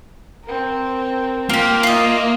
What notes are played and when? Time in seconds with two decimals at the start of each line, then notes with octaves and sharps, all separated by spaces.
0.44 C4 A#4
1.50 A#3 F4 G4 G5
1.83 F4 D#5 E5